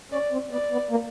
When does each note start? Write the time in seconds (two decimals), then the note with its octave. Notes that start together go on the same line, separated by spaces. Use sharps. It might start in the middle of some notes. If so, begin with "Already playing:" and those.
0.12 C#4 D5
0.32 C4
0.51 B3 D5
0.71 B3
0.91 A#3